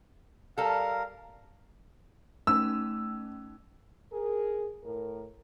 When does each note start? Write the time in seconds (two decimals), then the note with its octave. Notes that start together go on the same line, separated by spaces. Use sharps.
0.58 G3 A4 A#4 F5
2.47 A3 C#4 D#4 E6
4.12 G#4 A#4
4.84 A2 A#4